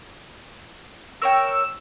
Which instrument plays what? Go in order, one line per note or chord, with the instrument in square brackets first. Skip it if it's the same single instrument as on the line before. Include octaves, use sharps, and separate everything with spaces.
[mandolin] A#4 C#5 G5 [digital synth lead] E6